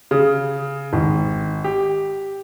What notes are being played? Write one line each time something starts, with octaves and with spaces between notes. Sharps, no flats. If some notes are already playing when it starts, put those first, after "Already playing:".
C#3
G#1
G4